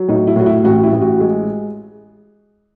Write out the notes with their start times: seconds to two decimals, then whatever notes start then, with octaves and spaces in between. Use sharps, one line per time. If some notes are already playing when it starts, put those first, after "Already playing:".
Already playing: F#3
0.08 A2 D#4
0.27 E4
0.36 A2 F#4
0.46 E4
0.64 A1 F#4
0.83 E4
0.93 A1
1.01 F#4
1.20 G#3